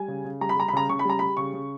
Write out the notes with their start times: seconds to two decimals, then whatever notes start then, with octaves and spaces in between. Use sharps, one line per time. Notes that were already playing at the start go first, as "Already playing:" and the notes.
Already playing: G3 G#5
0.08 C#3
0.24 C#3
0.41 G3 A#5
0.49 B5
0.56 G3 A#5
0.68 B5
0.73 C#3 A#5
0.89 C#3 C#6
0.99 B5
1.05 G3 A#5
1.19 G3 B5
1.37 C#3 C#6
1.54 C#3